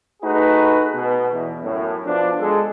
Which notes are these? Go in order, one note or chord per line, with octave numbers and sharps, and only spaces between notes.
A3 D#4 F#4 G#4 B4
B2
E2
F#2 A2
B2 F3 D4
G#3 A4